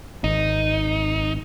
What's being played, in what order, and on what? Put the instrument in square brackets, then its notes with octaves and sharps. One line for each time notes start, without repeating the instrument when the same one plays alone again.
[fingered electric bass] G#1 [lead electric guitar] D#4